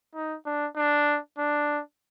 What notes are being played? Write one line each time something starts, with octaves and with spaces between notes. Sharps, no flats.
D#4
D4
D4
D4